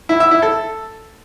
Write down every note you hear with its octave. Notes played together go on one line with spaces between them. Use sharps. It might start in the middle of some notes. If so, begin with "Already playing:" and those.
E4
E5
E4
A4